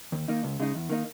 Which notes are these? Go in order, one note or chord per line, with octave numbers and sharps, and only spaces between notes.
D#2
D#3 A#3 D#4
C#2
C#3 G#3 D#4
E2
D#3 A#3 D#4